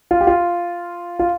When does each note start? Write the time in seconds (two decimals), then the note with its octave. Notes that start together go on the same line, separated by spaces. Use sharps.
0.11 F4
0.21 G4
0.27 F4
1.19 F4